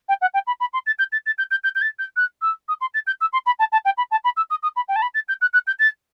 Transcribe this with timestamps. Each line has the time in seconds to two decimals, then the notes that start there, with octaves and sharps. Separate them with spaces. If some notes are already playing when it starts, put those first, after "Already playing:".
0.08 G5
0.21 F#5
0.34 G5
0.46 B5
0.60 B5
0.73 C6
0.86 A6
0.98 G6
1.12 A6
1.26 A6
1.38 G6
1.50 G6
1.63 G6
1.75 G6
1.81 A6
1.99 G6
2.16 F#6
2.41 E6
2.68 D#6
2.80 C6
2.94 A6
3.06 G6
3.20 E6
3.32 C6
3.46 B5
3.59 A5
3.72 A5
3.85 G5
3.97 B5
4.11 A5
4.24 B5
4.36 E6
4.50 D#6
4.62 D#6
4.76 B5
4.88 G5
4.95 A5
5.02 B5
5.14 A6
5.28 G6
5.41 F#6
5.53 F#6
5.67 G6
5.79 A6